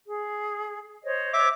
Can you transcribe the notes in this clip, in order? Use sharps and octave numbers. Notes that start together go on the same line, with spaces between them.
G#4
C5 C#5 D#5
E5 D6